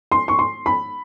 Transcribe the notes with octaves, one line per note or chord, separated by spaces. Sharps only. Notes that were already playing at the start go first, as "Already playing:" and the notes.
C6
C#6
C6
B5